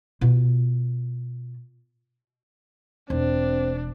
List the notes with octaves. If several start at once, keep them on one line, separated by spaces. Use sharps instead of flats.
B2 F4
E1 C4 D4